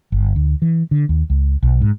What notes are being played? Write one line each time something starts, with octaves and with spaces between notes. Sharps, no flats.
G1
D2
E3
D3
D#2
C#2
B1
G#2